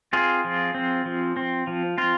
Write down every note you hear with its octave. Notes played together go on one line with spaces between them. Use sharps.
C4 F4 G#4
F3
C4
F3
C4
F3
C4 F4